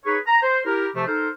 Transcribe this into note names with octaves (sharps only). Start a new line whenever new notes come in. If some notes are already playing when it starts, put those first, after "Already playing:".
D#4 G#4 B4 C#5
A#5
C5
E4 G4 A#4
C3 F3 A3
D#4 A4 A#4 C5